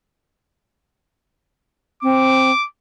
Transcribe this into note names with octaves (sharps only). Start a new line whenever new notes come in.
C4 D6